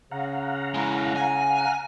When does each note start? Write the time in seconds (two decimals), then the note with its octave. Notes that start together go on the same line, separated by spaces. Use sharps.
0.11 C#3 F5 F#5 A#5
0.74 G#3 E4
1.16 G#5